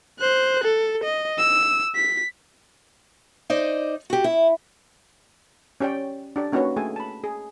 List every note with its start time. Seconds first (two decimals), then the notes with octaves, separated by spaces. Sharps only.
0.19 C5 F#6
0.64 A4
1.04 D#5
1.38 E6
1.95 B6
3.50 D#4 C5 D5 D#5
4.10 F#4 G4
4.24 E4
5.80 C#4 G4 C#5 D5 G5
6.36 D4 G4 D5
6.52 A#3 C#4 D#4 F#4 B4 C#5
6.76 A3 G#4 A4 G5 G#5
6.96 A5 B5
7.24 G#4